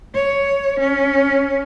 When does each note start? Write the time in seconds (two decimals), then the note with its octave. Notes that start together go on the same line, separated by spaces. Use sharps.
0.15 C#5
0.80 C#4